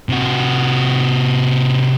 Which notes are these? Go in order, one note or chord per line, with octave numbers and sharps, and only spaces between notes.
C3 F#4